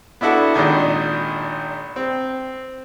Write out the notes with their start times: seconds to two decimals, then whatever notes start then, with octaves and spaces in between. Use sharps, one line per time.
0.21 B3 D4 E4 F#4 A4
0.54 G#1 A#2 D#3 D4
1.96 C4